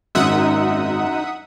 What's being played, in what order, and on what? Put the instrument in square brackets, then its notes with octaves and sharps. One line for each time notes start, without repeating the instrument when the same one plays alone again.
[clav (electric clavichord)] G#1 [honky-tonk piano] F#2 [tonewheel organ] D#4 [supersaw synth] E5 F#5 D#6